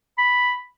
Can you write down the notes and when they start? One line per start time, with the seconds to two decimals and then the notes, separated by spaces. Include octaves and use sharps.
0.18 B5